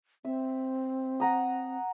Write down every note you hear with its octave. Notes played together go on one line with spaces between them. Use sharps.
C4 E5
F#5 A#5 D#6